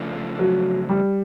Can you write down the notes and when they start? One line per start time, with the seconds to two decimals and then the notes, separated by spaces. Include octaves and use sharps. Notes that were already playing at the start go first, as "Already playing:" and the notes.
Already playing: C#3 F3 A3 D4 F4
0.39 F#3
0.89 G3